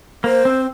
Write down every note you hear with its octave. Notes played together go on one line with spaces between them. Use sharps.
A#3 C5
C4